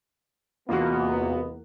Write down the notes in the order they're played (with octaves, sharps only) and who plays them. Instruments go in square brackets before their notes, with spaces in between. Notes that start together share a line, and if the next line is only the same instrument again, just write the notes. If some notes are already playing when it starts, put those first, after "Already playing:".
[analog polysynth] E2 A#3 [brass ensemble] C3 G#3 B3 [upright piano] F4 F#4